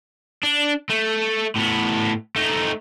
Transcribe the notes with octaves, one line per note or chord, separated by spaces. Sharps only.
D4
A3
A2 B3
A3 D#4